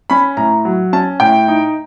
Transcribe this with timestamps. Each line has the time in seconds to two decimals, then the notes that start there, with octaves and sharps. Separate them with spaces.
0.10 C#4 B5
0.37 A2 A#5
0.65 F#3
0.93 C#4 A5
1.20 A2 G5
1.48 D#4